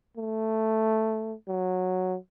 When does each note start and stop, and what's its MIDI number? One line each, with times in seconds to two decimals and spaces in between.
0.17 1.34 57
1.48 2.17 54